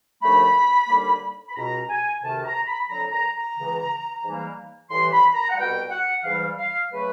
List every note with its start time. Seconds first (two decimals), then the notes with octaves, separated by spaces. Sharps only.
0.22 D#2 D3 F3 A3 B5
0.89 D#2 D3 G3 A#3
1.49 B5
1.55 C#2 B2 G#3 A#5
1.89 G#5
2.22 D2 C3 D#3 A5
2.44 A#5
2.67 B5
2.89 F2 D3 F#3 A#5
3.12 A#5
3.35 A#5
3.56 C#2 C#3 E3
4.23 G#2 E3 G3 A#3
4.90 A2 E3 G3 C6
5.12 B5
5.34 A#5
5.49 F#5
5.57 C2 B2 G3 G5
5.90 F#5
6.23 G#2 E3 G3 F5
6.58 F5
6.91 C#3 F#3 A3 B4